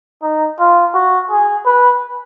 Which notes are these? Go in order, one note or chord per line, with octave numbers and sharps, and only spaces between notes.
D#4
F4
F#4
G#4
B4